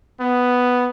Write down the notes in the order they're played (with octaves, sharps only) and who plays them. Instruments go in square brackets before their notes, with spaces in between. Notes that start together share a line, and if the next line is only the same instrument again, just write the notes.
[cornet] B3